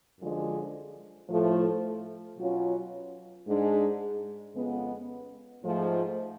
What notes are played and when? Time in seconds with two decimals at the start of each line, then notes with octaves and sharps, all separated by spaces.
0.19 F#2 D3 F3 G#3
1.29 A2 F3 A3
2.37 B2 F#3 C#4 F4
3.46 G#2 G#3 D4
4.55 F2 C#3 G#3 B3
5.64 G#2 F3 A3